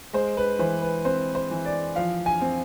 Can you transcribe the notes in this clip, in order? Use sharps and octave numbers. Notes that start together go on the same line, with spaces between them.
G#3 C5
B4
E3 C5
B4
C4 C5
C5
E3
D5
F3 F5
G#5
C4